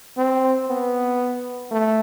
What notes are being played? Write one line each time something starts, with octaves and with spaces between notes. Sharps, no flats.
C4
B3
A3